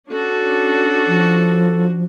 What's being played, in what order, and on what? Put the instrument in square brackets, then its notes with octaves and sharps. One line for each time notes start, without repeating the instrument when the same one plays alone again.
[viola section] C#4 D4 F#4 [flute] A4
[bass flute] F3